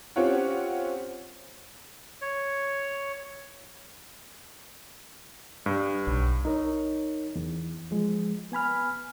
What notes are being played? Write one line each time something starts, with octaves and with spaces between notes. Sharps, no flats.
C4 C#4 F4 G4 C#5 F#5
C#5
G2
B1
D#4 A#4 C#5
E2
F3 G#3
B3 G#5 B5 F6